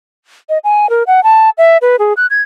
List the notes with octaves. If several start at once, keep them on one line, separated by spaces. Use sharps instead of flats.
D#5
G#5
A#4
F#5
A5
E5
B4
G#4
F#6
G#6